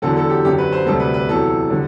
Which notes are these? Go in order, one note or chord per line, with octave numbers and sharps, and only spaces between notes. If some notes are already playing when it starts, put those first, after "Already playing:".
E2 D3 F#3 A4
A4
G4
F#2 D3 F#3 G4
B4
C5
D2 C3 G3 A4
B4
B4
E2 C3 F#3 A4
D3 G3